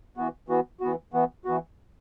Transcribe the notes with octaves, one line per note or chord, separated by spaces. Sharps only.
E3 B3 F#4
E3 B3 F#4
E3 B3 F#4
E3 B3 F#4
E3 B3 F#4